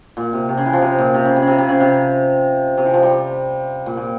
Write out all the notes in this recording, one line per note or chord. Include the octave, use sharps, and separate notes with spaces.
A#2
C3
C3
C#3
E3
F3
C3
A#2
C3
C#3
C3
C#3
C3
C3
C#3
C3
C3
E3
F3
G3
A#2
A#2